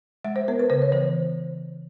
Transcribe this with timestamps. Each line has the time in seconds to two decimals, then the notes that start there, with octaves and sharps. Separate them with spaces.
0.25 G#3 E5
0.36 C5
0.48 B3 A#4
0.59 B4
0.70 C#3 C5
0.82 C#5
0.92 E3 C5